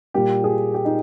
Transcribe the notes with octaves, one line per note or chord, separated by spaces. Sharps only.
A#2 G3 A#3 G4
G#4
G4
D#4